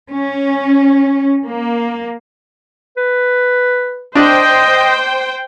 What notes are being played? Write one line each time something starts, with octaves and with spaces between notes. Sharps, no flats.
C#4
A#3
B4
D4 C5 D#5 G5